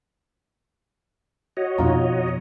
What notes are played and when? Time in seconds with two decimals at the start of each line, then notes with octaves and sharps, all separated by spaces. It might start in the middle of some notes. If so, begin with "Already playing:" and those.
1.57 F#4 C#5 D#5
1.78 F2 B2 D#4 F4 A#5